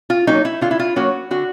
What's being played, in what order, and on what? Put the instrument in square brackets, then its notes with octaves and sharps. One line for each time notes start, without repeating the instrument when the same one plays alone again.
[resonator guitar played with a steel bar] F4
F#3 A#3 C#4 D#4
E4
D3 F4
E4
F4
F#3 A#3 C#4 F#4
D3 F#4